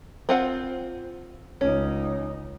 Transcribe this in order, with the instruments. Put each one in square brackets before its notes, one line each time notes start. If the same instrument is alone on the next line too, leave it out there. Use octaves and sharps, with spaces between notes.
[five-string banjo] C4 F4 F#5
[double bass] C#2 D#4 [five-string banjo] C#4